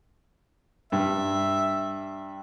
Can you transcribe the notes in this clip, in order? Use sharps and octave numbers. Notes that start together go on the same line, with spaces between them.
G2 E5